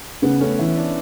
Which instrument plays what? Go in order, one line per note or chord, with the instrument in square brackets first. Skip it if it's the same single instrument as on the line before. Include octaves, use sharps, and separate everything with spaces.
[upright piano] C#3 [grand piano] B3
[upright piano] A3 [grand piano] C#4
[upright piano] E3 [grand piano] E4
[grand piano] D4